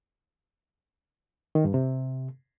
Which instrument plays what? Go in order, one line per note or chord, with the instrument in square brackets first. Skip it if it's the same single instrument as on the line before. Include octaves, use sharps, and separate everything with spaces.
[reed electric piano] D#3
G2
C3